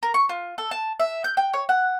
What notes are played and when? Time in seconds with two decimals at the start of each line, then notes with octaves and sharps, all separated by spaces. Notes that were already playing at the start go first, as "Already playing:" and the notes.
0.03 A#4
0.14 C#6
0.29 F4
0.58 A4
0.71 A5
1.00 E5
1.24 G6
1.37 G5
1.53 C#5
1.69 F#5